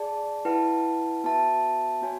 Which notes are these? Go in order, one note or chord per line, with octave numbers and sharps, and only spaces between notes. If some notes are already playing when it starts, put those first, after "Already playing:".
Already playing: G#4 D5 A5
E4 B4 F#5 A5
B3 F#4 B4 E5 A5
B3 F#4 C#5 G#5